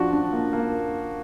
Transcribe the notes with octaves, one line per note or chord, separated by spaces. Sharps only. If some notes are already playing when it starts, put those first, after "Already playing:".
Already playing: F3 D4 F#4
D4
A#3
A#3